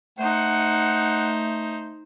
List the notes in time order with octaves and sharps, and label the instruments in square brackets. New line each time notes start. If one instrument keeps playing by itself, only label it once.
[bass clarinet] A3 [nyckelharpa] D#4 C5 [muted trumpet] F#5